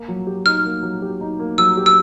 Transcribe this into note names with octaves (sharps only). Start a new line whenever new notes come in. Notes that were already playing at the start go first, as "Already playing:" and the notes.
Already playing: A#3
F#3
G4
D#4 F6
A#3
F#3
G4
D#4
A#3
F#3 E6
G4
E6